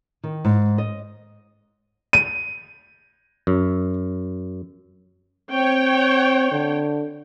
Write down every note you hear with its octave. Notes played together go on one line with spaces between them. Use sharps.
D#3
G#2
D#5
D#7
F#2
C4 C#5 G5
D3